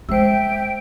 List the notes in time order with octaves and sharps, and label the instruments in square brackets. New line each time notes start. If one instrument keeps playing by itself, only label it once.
[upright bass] G#3 [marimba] C5 E6 [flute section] E5 G5